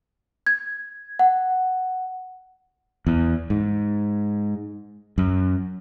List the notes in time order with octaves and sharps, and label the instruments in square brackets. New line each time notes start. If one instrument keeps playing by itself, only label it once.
[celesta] G#6
F#5
[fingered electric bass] E2
G#2
F#2